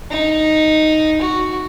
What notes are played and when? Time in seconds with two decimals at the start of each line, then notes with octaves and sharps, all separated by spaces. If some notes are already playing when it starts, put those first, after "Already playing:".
0.11 D#4
1.22 F#4